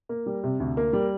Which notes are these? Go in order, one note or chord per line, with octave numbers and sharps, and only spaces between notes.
A#3
G3
C3
D2
A#3
G3